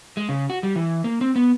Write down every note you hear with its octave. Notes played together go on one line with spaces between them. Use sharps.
G#3
C#3
F#4
G3
E3
A#3
C4
B3